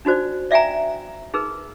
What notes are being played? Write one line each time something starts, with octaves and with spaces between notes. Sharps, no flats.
D4 D#4 F#4 C5 D5
D5 E5 F5 G5 G#5 A#5
D#4 G#4 A#4 B4